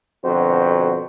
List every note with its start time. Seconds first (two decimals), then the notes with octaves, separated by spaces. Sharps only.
0.24 F2 B2 D3 F#4 C5